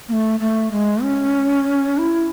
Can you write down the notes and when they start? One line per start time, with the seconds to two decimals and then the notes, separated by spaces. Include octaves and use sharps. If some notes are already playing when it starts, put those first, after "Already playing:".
0.09 A#3
0.13 A3
0.40 A3
0.72 G#3
1.03 C#4
1.98 E4